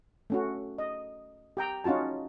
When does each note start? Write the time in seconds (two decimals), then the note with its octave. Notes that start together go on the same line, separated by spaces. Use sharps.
0.30 A3 C#4 F#4
0.78 D#5
1.57 G4 G5 A#5
1.84 C#4 D#4 F4 F#4 A5